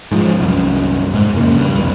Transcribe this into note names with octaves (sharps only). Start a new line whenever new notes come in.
G#2 F3
C2 F#2
G#2
F2 C#3 A#3
G2
C2 F2